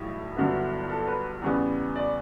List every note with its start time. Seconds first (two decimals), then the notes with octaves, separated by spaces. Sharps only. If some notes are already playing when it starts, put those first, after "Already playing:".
Already playing: B1 A2 E3 G3 E4
0.36 G1 G2 D3 F#3 B3
0.89 A4
1.08 B4
1.42 E2 C#3 G3 B3
1.96 D5